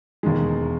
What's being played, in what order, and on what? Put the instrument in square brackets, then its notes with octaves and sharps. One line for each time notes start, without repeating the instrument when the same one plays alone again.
[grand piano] E1 D#2 D#3 G#3